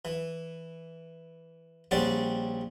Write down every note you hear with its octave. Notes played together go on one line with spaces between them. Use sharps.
E3
A#1 G3 C4 C#4 D5 F#5